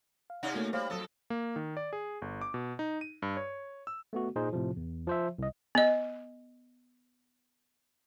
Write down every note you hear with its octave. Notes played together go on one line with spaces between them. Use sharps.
F5
C3 C#4 D#4 D5 F#5
A3 A#3 F#4
G3 C5 C#5 F5
F2 F#3 A4 D#6 E6
A#3
D#3
D5
G#4
G1
D6
B2
D#4
D#7
G2
C#5
E6
A3 B3 F#4
A#2 D#4 G#4 C5
A2 C3 F3
E2
F3 C5 E5
C2 D#5
B3 D#5